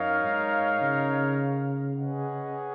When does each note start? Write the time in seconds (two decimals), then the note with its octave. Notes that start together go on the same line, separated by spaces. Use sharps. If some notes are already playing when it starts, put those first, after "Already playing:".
Already playing: F#2 D#4 A#4 C#5 F5
0.24 G#2
0.81 C#3
1.96 C#4 G#4 B4 D#5 F#5